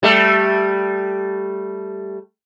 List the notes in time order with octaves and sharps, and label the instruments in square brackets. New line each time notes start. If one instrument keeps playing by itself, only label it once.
[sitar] G3 A3